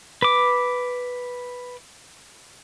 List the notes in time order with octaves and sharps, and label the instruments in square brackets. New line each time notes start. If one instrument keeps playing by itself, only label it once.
[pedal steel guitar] B4 D6